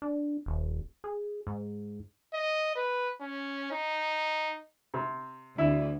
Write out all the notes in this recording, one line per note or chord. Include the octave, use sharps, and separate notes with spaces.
D4
D#1
G#4
G#2
D#5
B4
C#4
D#4
C3
D2 E4